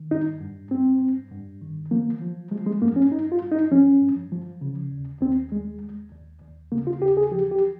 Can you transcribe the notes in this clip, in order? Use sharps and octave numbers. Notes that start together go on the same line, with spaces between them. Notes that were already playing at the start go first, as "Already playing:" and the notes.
Already playing: D#3
G2 D#4
G2
G2 C4
G2
G2
D#3
F3 A#3
F3
F3 G#3
G#3
G2 A#3
C#4
G2 D#4
F4
G2
D#4
F3 C#4
G2
F3
C#3
D#2
D#2 C4
D#2 G#3
D#2
D#2
D#2
C#3 A#3
F4
D#2 G4
G#4
F3 G4
G4